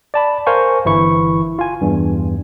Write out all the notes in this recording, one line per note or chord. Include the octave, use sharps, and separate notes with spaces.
D5 A5 B5
A#4 C5 F5 G#5 C#6
G1 E3 E4 C#6
F4 G#5
E2 G2